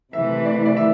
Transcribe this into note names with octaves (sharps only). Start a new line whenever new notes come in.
C3 E3 A3 E5
D5
D5
E5